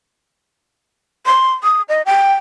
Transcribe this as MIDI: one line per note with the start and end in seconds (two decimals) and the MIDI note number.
1.26 1.52 84
1.63 1.82 87
1.89 2.02 75
2.06 2.34 79